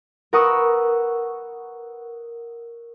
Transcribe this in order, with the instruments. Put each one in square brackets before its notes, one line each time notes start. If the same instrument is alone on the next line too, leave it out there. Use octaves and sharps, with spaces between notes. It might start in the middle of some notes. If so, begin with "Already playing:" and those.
[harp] A#4 B4 F#5 C#6 D#6 E6